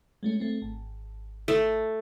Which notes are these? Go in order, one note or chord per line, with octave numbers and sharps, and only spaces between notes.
G#3 A3 C#4
A3 C4
G#1
A3